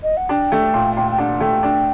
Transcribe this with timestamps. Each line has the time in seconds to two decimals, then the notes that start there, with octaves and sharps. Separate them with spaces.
0.03 D#5
0.17 F#5
0.29 D4 G5
0.52 A3
0.74 A#2
0.96 A#2 G5
1.11 G5
1.18 D4 F#5
1.41 A3 G5
1.63 D4